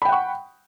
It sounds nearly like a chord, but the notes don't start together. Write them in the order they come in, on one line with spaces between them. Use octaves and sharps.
B5 G5 F#5 C#6